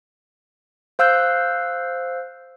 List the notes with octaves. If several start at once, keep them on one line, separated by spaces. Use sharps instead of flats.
C5 F5 E6 F#6 G6